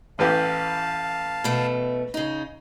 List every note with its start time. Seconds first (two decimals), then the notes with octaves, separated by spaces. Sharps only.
0.19 A1 E3 G4 F5 A5
1.44 B2 A3
2.14 C#3 D#4